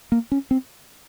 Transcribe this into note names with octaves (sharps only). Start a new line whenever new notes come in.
A#3
C#4
C4